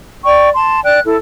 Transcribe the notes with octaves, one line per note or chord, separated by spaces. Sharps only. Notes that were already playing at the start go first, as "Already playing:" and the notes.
D5 G5 C#6
A5 C6
D5 G5 F#6
E4 A4